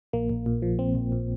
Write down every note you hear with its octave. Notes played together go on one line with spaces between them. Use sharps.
A#1 A#3
A#1
A#2
F3
A#1 C4
A#1
A#2